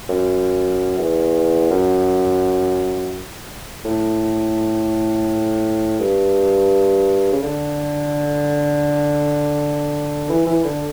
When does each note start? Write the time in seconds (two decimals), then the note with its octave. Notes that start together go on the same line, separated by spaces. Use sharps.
0.09 F#2
0.98 E2
1.70 F#2
3.85 A2
6.00 G2
7.32 C#3
7.42 D3
10.30 E3
10.47 E3
10.64 D3